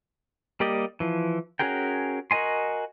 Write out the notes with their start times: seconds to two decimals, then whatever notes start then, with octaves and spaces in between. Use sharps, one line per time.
0.60 G3 A#3 G4 D5 D#5
1.00 E3 F3
1.59 C#4 F#4 G#4 A#4 G5
2.31 F#4 A#4 D#5 G#5 C6